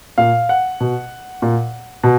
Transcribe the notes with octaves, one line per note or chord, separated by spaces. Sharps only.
A#2 F5
F#5
B2
A#2
B2